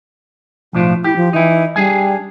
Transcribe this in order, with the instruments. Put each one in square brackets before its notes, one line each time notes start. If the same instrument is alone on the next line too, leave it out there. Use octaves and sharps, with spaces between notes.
[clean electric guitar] B1 A2 D4 [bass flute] F3
[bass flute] E4 [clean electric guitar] G4
[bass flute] F3
[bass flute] E3 [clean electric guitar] D#4 E4
[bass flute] G3 [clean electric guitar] D4 G#4 G#5